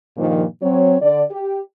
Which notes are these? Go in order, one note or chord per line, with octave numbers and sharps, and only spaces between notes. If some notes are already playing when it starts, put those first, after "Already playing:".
G2 A#2 D#3 F3
F#3 C4 C#5
D3 D5
G4